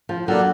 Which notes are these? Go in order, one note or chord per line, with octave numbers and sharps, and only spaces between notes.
F3
F#3 A#3 D4 F4 A4